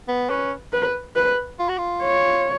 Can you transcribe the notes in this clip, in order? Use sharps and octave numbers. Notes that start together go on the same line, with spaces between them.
B3
C#4 B4
B4
B4
F4
F#4
F4
C#5